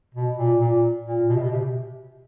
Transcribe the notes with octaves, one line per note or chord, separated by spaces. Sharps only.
B2
A#2
A#2
A#2
B2
C3
B2
C3